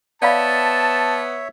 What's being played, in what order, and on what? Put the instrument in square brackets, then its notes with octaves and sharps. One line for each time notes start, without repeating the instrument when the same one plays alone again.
[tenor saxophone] B3 [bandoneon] C#5 E5 [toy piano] D5 F5 B5 [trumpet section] A5